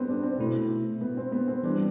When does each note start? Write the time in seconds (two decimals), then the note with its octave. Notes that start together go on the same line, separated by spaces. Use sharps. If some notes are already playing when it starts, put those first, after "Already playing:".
Already playing: G3 B3 C4
0.08 D4
0.23 C4
0.39 B2 A3 E4
1.01 B3
1.17 C4
1.32 B3
1.48 C4
1.64 E3 G3 B3 D4